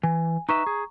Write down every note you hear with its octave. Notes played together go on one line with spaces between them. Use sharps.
E3 G#5
D#4 B4 E5 A#5 C#6
G#4